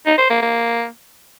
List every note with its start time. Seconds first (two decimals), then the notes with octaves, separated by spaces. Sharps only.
0.06 D#4
0.18 C5
0.30 A#3
0.42 A#3